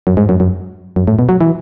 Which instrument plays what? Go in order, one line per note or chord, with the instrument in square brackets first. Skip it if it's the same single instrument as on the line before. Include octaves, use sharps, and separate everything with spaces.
[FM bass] F#2
G#2
F#2
F#2
F#2
A2
B2
F#3
E3